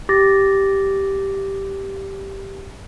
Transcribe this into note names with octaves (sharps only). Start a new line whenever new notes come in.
G4 D6 A6 A#6